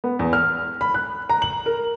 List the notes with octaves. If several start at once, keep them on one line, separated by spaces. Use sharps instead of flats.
B3
E2
F6
B5
F#6
A#5
F#7
A#4